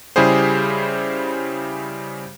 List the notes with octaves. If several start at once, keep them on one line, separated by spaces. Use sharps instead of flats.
C#3 G3 E4 G4 G#4 C5